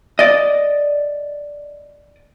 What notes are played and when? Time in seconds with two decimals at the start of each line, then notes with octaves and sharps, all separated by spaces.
0.19 D5 D#5